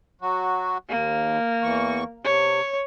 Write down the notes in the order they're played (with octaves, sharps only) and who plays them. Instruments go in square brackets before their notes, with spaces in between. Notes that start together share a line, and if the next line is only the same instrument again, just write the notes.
[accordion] F#3 F#4
[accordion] D#2 [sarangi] A#3
[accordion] E2 E3 C#6
[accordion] C3 [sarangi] C#5